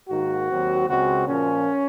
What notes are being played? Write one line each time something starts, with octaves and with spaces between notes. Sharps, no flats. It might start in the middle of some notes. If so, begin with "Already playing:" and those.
G#2 D#3 A#3 F#4
D#2 D#3 F#3 C4
C#2 C#3 G#3 C4 F#4
A#2 F3 A#3 C#4